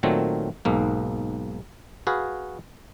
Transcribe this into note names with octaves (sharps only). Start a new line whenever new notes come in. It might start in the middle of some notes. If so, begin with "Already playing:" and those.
A#2 D#3 F#3 A3 C4
B1 G#2 A#3
F#4 G#4 B4 F5